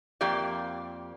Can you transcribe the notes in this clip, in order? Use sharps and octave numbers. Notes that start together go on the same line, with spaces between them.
F2 A#3 G4 D5